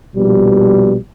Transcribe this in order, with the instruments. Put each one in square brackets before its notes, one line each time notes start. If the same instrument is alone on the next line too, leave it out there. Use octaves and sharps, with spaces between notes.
[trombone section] A#1 B2 G3